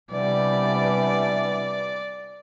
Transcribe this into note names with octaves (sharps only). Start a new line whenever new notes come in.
C3 E3 G3 B3 D4 D5